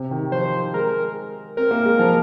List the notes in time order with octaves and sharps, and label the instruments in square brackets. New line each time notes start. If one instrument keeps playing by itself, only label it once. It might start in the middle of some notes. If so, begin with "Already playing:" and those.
Already playing: [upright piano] C3
D#3
[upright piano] F3 [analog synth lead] C5
[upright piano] G#3 [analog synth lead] A#4
[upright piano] C4 [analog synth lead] A#4
[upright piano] A#3
G#3
F3